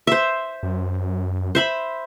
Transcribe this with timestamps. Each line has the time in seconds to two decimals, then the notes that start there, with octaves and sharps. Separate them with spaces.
0.07 C5 E5
0.63 F#2
1.55 C5 E5 B5